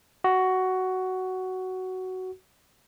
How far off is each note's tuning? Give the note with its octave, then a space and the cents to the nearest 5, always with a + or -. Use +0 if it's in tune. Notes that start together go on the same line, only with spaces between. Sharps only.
F#4 +10